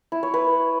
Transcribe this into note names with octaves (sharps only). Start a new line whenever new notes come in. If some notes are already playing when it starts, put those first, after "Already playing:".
E4
C#5
B4